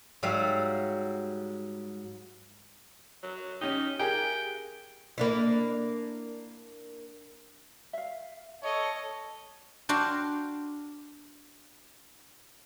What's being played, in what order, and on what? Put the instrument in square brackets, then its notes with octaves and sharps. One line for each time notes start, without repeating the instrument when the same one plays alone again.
[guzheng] G#2 F#3 G3 E5 F5
[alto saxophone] F#3
[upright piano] C#4 G4 [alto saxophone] D#4
[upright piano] G4 G#4 A#4 [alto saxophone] G5
[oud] A#3 D4 E4
[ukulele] E5 F5
[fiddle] A4 D#5 [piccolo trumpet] C#5
[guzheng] D4 F#4 F5 G5 A#5 C6